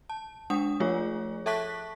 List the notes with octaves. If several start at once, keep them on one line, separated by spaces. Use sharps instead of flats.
A5
G#3 D4 F#5 D#6
F3 A3 F4 G#4 C#5
A4 E5 A5 C#6 F#6 B6